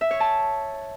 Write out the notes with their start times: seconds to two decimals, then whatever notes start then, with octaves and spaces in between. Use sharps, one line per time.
0.01 E5
0.11 C#5
0.20 A5